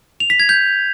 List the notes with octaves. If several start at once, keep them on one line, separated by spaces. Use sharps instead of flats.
F7
B6
G#6
G6